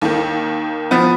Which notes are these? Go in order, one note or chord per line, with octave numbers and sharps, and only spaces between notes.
D#2 D#3
F3 B3